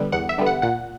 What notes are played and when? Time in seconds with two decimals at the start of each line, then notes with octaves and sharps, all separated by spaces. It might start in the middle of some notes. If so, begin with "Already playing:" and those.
Already playing: D3 G3 B3
0.12 E2 F#5
0.29 E5
0.38 D3 G3 B3
0.46 F#5
0.62 A#2 F#5